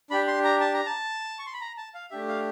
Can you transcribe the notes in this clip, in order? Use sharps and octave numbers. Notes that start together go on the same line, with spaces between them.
D4 G4 B5
C6
A#5
A5
A#5
A5
C#6
C6
B5
A#5
A5
F5
A3 D4 G4 E5
F5